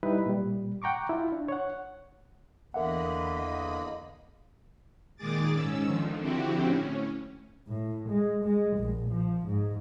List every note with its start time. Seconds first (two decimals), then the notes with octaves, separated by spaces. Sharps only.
0.03 G3 D#4 E4 B4
0.26 A#2 G3
0.82 F#5 G5 A#5 C#6 D6
1.09 E4 F4
1.32 D4
1.48 C#5 F#5
2.74 E2 D3 A#3 A#4 D#5 E5 F#5 B5
5.17 A#2 D#3 G#3 G#4 D6 A6
5.52 G#2 C#4 E6
5.87 D3 D#3 F3
6.19 D3 F3 C4 E4 F#4 G4
6.65 A2 C#4
7.68 A2
8.09 G#3
8.44 G#3
8.77 A#1
9.12 F3
9.46 G#2